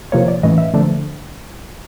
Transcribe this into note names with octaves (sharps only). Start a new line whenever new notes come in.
C3 F3 A#3 C#5
D5
A2 E3 A3 C#4 D#5
E5
D3 F3 A3 D4